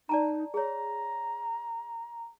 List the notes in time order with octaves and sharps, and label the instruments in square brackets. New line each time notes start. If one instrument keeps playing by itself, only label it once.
[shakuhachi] D#4 [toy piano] D5 A5 A#5
[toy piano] G#4 C#5 [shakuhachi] A#5